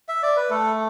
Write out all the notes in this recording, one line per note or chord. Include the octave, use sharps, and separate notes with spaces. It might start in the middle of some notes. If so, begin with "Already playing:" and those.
E5
D5
B4
A3 A4